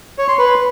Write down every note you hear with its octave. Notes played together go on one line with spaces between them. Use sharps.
C#5
C6
B4